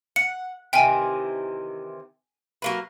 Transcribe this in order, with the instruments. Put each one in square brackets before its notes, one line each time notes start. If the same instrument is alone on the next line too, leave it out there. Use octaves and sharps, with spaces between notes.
[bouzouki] F#5 [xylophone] C#7
[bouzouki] C3 D#3 E3 [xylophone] G5 G#5
[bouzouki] F#3 A#3 B4